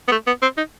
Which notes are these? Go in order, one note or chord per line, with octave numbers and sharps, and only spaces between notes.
B3
A3
B3
C4
D#4